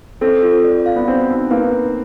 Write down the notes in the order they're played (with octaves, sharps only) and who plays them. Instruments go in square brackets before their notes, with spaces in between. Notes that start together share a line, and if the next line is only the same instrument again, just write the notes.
[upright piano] C4 [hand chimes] A4
[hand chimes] F4
D5
F5
[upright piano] B3
[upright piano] C4 [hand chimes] F#4
[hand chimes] D#4
[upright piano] A#3 [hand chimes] B4
[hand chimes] D#4